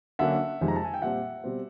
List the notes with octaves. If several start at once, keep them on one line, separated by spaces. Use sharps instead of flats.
D3 F#3 A#3 C#4 E5 F#5
F2 C3 D#3 G#3
A#5
A5
G#5
G5
A#2 G3 C4 E5 F#5
B2 G3 C4